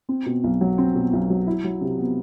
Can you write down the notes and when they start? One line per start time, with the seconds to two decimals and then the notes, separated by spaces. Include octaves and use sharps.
0.09 C4
0.26 B2
0.44 B1
0.61 F#3
0.78 C4
0.95 B2
1.13 B1
1.30 F#3
1.47 E4
1.64 F#3
1.81 C3
1.99 B3